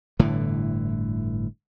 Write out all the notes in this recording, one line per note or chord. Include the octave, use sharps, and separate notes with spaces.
G1 A2 D3 E3